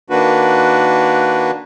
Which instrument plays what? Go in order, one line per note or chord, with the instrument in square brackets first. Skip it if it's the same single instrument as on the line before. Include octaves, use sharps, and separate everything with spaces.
[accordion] D#3 A#3 D4 F#4 B4